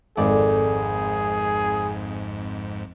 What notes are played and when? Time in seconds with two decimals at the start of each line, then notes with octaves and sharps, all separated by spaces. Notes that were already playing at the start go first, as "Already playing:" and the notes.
0.17 G#1 F2 G#2 G#4 A4 D5